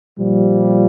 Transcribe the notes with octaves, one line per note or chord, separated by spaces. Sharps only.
A#2 F3 G3